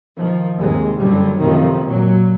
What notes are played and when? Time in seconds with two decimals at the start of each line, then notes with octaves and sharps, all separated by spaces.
0.18 D#3 F3
0.60 D#2 G#2 C3 G#3
1.00 F#1 D3 F#3 G3
1.40 F#2 A2 C3 D#3 F3
1.86 A#2 F#3